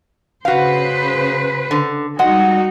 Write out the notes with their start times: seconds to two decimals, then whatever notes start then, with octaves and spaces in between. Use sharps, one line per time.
0.45 C#3 F#4 B4 C5 F5
1.71 D3
2.19 G3 G#3 D#4 F#4 F#5